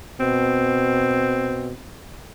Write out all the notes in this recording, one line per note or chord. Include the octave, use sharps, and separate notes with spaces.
B2 C4